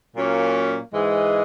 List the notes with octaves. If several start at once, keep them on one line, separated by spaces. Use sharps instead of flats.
A#2 F#3 A#3 C#4
G#2 E3 G#3